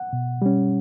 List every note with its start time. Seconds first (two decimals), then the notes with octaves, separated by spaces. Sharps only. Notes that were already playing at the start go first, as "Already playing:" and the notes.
Already playing: F#5
0.13 B2
0.42 G3 C#4